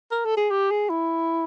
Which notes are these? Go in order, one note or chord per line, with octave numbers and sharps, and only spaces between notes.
A#4
A4
G#4
G4
G#4
E4